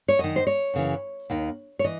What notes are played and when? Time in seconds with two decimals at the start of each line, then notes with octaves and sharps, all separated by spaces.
0.08 C#5
0.19 F#2 D#3 D#5
0.36 C5
0.47 C#5
0.74 F#2 C#3 E3
1.30 D#2 D#3
1.79 C#5
1.84 E3 D#5